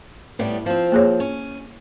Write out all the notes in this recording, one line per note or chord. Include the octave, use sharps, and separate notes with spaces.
A2 G3 B3
F3 C4
A#3 G#4 C#5
C#4